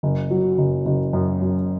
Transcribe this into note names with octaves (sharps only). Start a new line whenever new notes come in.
F#1
F#3
F#1
F#1
F#2
F#2